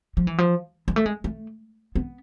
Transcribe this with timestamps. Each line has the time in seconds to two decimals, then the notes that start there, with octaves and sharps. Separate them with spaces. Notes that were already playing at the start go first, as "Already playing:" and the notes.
0.17 F3
0.27 E3
0.38 F3
0.88 G#3
0.96 A3
1.06 G#3
1.24 A3
1.95 B3